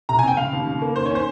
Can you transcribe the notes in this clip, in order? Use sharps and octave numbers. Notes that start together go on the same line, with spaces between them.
C3 A#5
G#5
C4 G5
C#3 F5
D#2
C#3
A#3
D#3 C5
C#5
C#4 C5